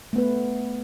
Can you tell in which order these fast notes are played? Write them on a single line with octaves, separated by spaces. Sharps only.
A3 B3 B4